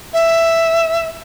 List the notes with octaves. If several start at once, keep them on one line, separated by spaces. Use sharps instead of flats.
E5